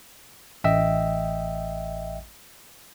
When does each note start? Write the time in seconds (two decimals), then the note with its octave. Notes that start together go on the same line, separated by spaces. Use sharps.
0.64 A1 D#5 E5 G5 E6